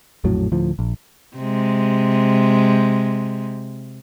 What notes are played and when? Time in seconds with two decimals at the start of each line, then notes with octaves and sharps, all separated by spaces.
0.24 A#1 F2 A2 F#3
0.52 D2 A2 F3
0.79 A#1
1.37 C3 G#3